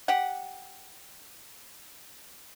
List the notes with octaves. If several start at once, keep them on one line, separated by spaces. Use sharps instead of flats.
G4 F#5